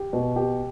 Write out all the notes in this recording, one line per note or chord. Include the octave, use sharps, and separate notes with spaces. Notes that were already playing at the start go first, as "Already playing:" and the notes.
Already playing: G4
B2
G4